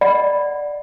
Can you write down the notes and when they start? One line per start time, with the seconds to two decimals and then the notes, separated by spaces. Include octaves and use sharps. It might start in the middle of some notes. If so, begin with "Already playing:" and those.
0.01 D5 D#5 F#5 B5